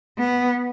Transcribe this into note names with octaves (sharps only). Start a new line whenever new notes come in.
B3